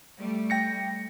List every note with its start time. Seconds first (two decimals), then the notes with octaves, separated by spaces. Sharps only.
0.18 G3 A3
0.50 G5 A#6 C#7